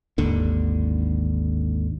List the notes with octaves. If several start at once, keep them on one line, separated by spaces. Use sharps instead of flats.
G#1 D#2 D3